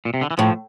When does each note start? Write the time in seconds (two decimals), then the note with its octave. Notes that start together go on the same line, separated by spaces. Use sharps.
0.05 A#2
0.14 C3
0.21 D3
0.31 E3
0.38 A2 F3